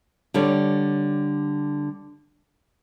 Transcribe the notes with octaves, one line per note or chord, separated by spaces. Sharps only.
D3 G3 C#5